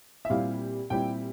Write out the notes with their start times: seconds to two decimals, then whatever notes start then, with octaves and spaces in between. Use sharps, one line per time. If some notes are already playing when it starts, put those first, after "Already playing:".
0.25 E5
0.30 A#2 G3 C4 E4 F5
0.90 A#2 G3 C4 E4 G5